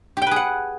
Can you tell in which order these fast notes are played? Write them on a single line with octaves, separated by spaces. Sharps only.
G4 G5 B4 G#4 F#5